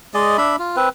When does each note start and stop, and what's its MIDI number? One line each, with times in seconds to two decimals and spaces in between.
0.14 0.37 56
0.14 0.37 68
0.14 0.37 74
0.14 0.37 75
0.38 0.56 62
0.38 0.56 76
0.38 0.56 83
0.59 0.76 65
0.76 0.89 60
0.76 0.89 71